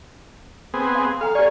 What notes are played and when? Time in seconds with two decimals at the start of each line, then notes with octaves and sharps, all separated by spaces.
0.74 B3 C4 G#4
0.95 F5 C6
1.21 A4 F5 G#5 A#5
1.35 G4 D5 G#5 C#6